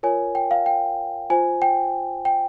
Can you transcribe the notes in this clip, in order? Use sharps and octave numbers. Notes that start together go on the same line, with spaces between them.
F4 A#4 C#5 G#5
G5
F5
G5
F4 C5 G#5
G5
G5